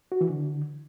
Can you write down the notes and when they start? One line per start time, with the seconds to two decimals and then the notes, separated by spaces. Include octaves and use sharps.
0.12 F#4
0.21 E3
0.30 D3